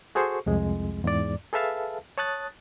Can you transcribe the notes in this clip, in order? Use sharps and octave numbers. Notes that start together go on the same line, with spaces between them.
F#4 G#4 A4 C5 C#6
C2 F2 G#3
E2 G#2 D5
G#4 A4 B4 E5 F5 A5
C#5 A5 D#6 F#6 A6